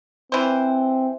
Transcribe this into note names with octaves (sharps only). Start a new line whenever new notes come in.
E3 C4 C5